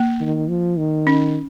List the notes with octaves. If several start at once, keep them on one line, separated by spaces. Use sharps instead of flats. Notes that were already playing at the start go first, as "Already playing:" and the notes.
Already playing: A#3
D#3
F3
D#3
C#4